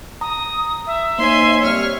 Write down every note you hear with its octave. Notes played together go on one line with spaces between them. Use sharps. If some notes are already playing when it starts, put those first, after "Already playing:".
A#5 D#6
E5
A#3 D#4 C5 C#5 G#5 C6
F#2 C3 G3 C#5 F6